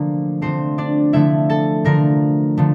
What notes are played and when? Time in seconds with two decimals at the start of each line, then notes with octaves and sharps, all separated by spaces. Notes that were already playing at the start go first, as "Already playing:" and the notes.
Already playing: D3 F3 A3 A#3 A#4
0.41 D3 F3 A3 C4 C5
0.78 D4 D5
1.13 D3 F3 A3 E4 E5
1.50 A4 A5
1.84 D3 F3 A3 A#4 A#5
2.57 D3 F3 A3